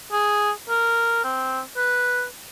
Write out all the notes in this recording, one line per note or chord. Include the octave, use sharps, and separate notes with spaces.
G#4
A#4
C4
B4